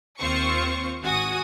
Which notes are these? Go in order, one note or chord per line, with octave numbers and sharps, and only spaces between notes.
D#2 C4 F4 C5 C#6 C#7
G#1 F#4 G#5 D#6